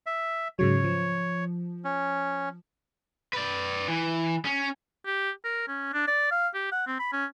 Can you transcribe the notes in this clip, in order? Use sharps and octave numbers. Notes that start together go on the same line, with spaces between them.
E5
G#2 C#3 F#3 C#5
F3
C#4
B4 D5
E3
C#4
G4
A#4
C#4
D4
D5
F5
G4
F#5
C4
B5
C#4